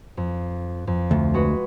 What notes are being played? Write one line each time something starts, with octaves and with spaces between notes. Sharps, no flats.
F2
F2
D2
G#3 F#4 B4